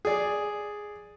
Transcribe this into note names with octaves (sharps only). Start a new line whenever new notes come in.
G#4 D5